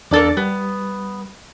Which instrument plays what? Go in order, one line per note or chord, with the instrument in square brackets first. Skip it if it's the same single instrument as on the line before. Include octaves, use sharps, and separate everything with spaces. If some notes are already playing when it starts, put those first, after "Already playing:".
[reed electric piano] E2 D4 A6 [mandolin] A#3 A4 D5
[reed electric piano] G3 [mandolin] B3